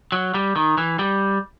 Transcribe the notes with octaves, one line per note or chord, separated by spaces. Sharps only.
F#3
G3
D#3
E3
G3